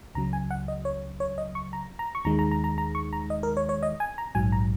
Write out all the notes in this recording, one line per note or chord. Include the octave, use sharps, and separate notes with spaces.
C#2 C#3 F#3 A#5
G#5
F#5
D#5
C#5
C#5
D#5
C#6
A#5
A#5
C#6
D#2 D#3 G#3 A#5
A#5
A#5
A#5
A#5
C#6
A#5
D#5
A#4
C#5
C#5
D#5
G#5
A#5
A#1 G#2 F#3 G#5
A#5